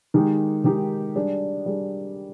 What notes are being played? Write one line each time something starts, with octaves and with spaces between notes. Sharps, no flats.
D#3 G#3 D#4 G4
D#3 G#3 D#4 G4
G3 D4 G#4
G3 D4 G#4